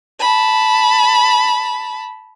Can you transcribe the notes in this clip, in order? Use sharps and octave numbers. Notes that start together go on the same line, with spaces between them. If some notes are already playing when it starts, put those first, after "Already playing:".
A5 B5